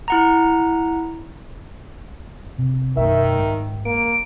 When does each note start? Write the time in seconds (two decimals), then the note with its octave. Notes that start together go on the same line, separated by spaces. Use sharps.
0.08 E4 F#5 A#5
2.59 C3
2.97 B1 F#2 D#3 A3 E5
3.38 G#2
3.85 A#3 D7